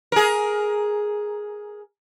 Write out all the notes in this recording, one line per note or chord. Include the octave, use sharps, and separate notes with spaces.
G#4 A#4